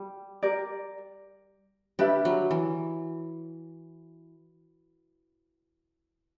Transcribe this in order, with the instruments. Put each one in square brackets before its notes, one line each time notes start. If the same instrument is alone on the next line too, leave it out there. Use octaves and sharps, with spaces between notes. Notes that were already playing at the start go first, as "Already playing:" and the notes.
Already playing: [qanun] G3
[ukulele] G4 A#4 D5
[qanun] G3 [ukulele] D4 G4 B4 E5
[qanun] F#3
E3